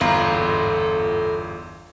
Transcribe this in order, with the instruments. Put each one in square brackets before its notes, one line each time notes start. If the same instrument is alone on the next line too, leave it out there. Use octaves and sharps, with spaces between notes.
[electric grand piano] G1 E2 A#5 [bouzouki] F4 [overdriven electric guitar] A4 B5